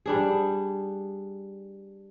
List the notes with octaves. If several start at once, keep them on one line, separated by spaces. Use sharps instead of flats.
G3 D4 G#4